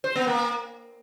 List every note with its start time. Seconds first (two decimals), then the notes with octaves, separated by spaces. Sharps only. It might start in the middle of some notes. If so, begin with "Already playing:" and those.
0.04 C5
0.16 B3
0.27 A#3